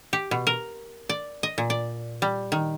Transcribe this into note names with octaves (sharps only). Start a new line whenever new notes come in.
G4
B2
A#4
D5
D#5
A#2
D5
G3
D#3